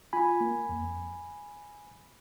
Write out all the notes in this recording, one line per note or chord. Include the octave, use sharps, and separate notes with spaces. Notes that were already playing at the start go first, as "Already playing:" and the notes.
F4 G#5 B5
A#3
F2